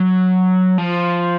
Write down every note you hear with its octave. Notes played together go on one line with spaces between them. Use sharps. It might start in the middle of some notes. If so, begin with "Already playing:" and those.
Already playing: F#3
F3